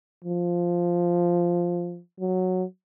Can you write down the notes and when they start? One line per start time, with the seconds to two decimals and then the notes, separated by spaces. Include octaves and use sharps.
0.24 F3
2.20 F#3